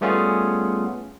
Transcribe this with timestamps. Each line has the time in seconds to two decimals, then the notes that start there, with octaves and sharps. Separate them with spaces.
0.01 G3 A3 B3 C#4 F4 G#4